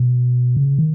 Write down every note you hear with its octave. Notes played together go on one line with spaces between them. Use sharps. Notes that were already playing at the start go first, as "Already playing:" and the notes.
Already playing: B2
C#3
D#3